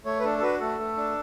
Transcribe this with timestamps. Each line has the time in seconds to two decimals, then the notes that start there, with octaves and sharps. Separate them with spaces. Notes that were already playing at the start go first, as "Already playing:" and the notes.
0.05 A3 C#5
0.20 B4
0.24 D4 A4
0.38 A4
0.42 F#4 B4
0.60 A3 A4
0.79 A3
0.97 D4